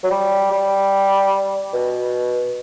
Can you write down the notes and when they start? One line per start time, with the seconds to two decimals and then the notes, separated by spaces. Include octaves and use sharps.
0.04 F#3
0.11 G3
0.51 G3
1.73 B2